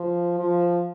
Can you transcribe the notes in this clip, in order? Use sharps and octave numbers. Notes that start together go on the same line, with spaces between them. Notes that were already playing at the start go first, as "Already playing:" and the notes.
Already playing: F3
F3